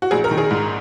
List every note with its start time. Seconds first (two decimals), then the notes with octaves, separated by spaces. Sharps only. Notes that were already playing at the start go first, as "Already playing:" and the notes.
0.02 F#4
0.11 A#1 G#4
0.24 A#4
0.31 D#3
0.38 G#4
0.51 G#2